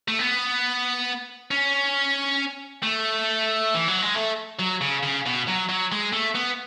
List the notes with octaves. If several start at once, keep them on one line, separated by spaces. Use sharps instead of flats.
A3
B3
C#4
A3
E3
F#3
G#3
A3
F#3
C#3
C#3
B2
F#3
F#3
G#3
A3
B3